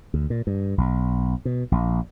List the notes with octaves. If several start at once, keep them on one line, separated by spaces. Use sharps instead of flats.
D2
A#2
G2
B1
B2
A#1